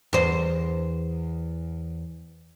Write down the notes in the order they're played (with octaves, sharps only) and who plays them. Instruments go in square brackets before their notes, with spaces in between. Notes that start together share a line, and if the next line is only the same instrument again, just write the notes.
[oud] E2 C5